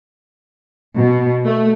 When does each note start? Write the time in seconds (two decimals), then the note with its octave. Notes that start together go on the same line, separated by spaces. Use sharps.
0.97 B2
1.45 A3